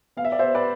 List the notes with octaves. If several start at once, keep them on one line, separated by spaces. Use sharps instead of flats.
B3 F5
E5
D5
B3 C5 E5
B4 D5